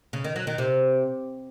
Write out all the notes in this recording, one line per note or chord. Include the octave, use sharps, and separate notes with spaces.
C#3
D#3
F#3
D#3
C3